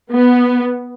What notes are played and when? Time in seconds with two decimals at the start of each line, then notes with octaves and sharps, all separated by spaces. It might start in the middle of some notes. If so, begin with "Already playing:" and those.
0.11 B3